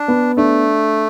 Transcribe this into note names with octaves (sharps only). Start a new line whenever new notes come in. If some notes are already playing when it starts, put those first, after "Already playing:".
Already playing: D4
B3
A3 D4